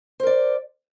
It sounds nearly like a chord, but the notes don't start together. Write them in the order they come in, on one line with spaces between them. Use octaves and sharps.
C5 A#4 D5